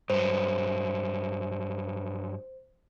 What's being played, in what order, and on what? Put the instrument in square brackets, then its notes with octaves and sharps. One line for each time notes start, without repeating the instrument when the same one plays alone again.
[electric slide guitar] G2 F#3 [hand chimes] C5